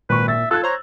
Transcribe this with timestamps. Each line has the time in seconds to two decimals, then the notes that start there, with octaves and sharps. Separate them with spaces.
0.10 G#1 A#2 B4 C#6
0.28 E5 A6
0.51 F4 A4 E6 F#6 G#6
0.64 C5 C#5 A#5